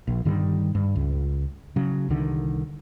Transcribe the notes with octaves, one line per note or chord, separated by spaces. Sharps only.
A#1
G2 D3 D#3 G3
G2
C#2
C#3 F#3
C2 D3 D#3